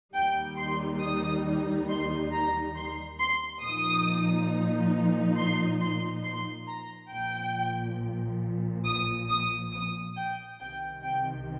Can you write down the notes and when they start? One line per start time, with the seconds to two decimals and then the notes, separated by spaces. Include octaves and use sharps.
0.14 D#2 D#3 G3 D#4 G5
0.58 C6
1.01 D#6
1.89 C6
2.32 A#5
2.75 C6
3.20 C6
3.62 A#2 F3 D#4 D#6
5.37 C6
5.81 C6
6.24 C6
6.68 A#5
7.11 A#1 A#2 F3 G5
8.85 D#6
9.29 D#6
9.73 D#6
10.17 G5
10.60 C2 C3 D#3 G5
11.03 G5